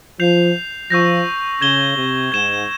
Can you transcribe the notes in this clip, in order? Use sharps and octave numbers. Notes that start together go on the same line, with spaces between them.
F3 G6 C7 F7
F3 C#6 E6 G6 A#6
C#3 G#6 E7 G7
C3
G#2 G#6 E7 G7